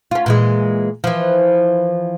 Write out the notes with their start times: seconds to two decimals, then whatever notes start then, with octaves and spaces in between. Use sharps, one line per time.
0.11 C#4 F4
0.26 A#2 E3 G#3
1.04 E3 F3